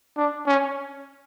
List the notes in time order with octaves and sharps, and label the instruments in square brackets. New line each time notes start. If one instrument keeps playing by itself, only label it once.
[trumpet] D4
C#4